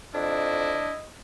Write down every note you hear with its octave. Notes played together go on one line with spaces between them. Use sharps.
F2 D4 E4 D#5